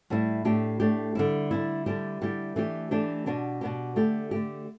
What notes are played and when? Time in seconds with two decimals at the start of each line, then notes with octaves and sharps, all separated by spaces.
0.10 A2 G3 E4
0.45 A2 A3 D4 G4
0.80 A2 A3 D4 G4
1.15 D3 G3 E4
1.51 D3 G3 E4
1.86 D3 G3 E4 G4
2.21 D3 G3 E4 G4
2.56 E3 A3 D4 G4
2.91 E3 A3 D4 G4
3.26 B2 B3 D4 G4
3.61 B2 B3 D4 G4
3.96 D3 A3 G4
4.31 D3 A3 G4